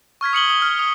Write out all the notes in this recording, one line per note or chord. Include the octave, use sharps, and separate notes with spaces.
C#6 F6 G#6 B6
D#6 C#7 F#7 G7
D#6 G7
F6
D#6